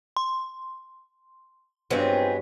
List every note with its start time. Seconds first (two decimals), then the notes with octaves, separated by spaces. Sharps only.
0.17 C6
1.90 G2 F#3 G#3 B3 C4 F4 G#4 C5